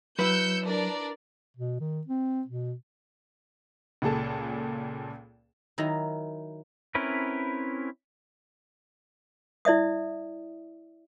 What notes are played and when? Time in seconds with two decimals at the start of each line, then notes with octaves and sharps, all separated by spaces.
0.19 F#3 E4 B4 E6 G6 C#7
0.65 D4 A#4 D5
1.57 B2
1.80 D#3
2.07 C4
2.47 B2
4.02 C#2 A#2 G#4 A4 A5
5.78 D#3 F#3 E4 D#5 A#5
6.95 C4 C#4 E4 A#4 B4
9.65 E4 D5 E5 D#6